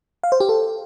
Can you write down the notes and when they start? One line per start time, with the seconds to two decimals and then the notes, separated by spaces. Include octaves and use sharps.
0.24 F5
0.32 C5
0.40 G4
0.49 A4